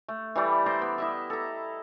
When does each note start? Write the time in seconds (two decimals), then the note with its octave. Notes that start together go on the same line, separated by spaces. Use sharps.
0.08 A3
0.35 E3 G3 A3 D5
0.66 C5 D5 E5 A#5
0.82 B3
0.98 E4 D#5 E5
1.30 A4 A#5